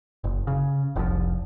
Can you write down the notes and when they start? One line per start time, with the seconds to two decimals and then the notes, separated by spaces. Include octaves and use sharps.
0.24 F#1
0.47 C#3
0.96 F1 C2 B2 F3